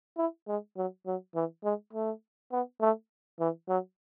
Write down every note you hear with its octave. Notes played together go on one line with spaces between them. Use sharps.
E4
G#3
F#3
F#3
E3
G#3
A3
B3
A3
E3
F#3